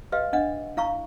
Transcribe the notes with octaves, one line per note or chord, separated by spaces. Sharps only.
G4 B4 D#5 F5
D4 D#5 F#5
E4 F5 A#5 C#6